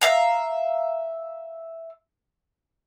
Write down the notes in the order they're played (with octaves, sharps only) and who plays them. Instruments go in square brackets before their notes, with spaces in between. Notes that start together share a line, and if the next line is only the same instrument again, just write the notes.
[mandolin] E5 F5 A#5